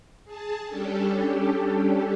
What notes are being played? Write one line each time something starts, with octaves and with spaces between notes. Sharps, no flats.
G#4 A5
G3 C#4 D4 G4 A4